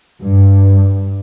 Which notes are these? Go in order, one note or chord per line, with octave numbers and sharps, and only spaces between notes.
G2